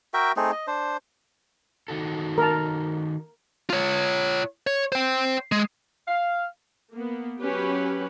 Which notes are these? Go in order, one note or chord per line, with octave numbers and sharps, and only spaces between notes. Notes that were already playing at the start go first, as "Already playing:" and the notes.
F#4 A#4 E5 G5
A3 C4 D#4 G#4
D#5
D4 C5
D#3 F#4 A4
A#4 A5
F4 C#5
C#5
C5 G5
G#3
F5
A#3 B3
F#3 C#4 G4 B4